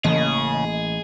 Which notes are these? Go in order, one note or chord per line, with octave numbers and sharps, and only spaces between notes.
A1 C#3 E3 A#3 G#4 D#5